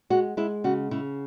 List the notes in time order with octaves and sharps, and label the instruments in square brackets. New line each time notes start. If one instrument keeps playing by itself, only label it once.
[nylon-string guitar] G#3 F#4
G#3 E4
C#3 F#4
C#3 E4